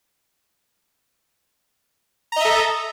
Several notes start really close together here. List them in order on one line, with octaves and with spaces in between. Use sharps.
A#5 D#5 E5 A4